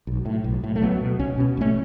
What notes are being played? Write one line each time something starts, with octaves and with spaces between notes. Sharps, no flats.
B1
A2
B1
A2
A3
C#2 F#3 B3
B2
C#2 C#4
B2 C#4
A1 A3 C#4